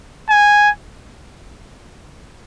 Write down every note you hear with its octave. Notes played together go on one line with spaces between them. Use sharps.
G#5